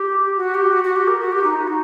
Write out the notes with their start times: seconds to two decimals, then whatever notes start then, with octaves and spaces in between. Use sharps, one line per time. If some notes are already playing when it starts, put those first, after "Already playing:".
Already playing: G4
0.37 F#4
0.54 G4
0.72 F#4
0.84 F#4
0.96 G4
1.07 A#4
1.19 F#4
1.32 G4
1.43 D#4
1.55 F#4
1.67 D#4